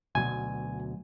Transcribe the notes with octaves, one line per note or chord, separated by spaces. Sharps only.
D2 B2 F#3 G#5